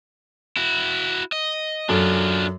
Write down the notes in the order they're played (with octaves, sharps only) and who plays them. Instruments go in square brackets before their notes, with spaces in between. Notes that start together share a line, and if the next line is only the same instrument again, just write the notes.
[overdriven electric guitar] E4 F#4
D#5
[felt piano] F#2 A4 [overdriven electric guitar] D4 F4